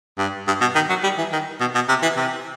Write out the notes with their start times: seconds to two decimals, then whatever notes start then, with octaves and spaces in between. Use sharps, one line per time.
0.18 G2
0.47 G2
0.61 B2
0.75 D#3
0.89 F#3
1.03 G3
1.18 E3
1.32 D#3
1.60 B2
1.75 B2
1.89 C3
2.02 E3
2.16 C3